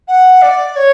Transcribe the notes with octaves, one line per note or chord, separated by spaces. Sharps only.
F#5
D5
C#5